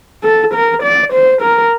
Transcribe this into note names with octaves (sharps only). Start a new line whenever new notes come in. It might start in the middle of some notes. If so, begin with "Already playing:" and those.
A4
A#4
D5
C5
A#4